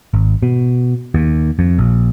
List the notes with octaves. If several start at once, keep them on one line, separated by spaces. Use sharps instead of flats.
G#1
B2
D#2
F2
A#1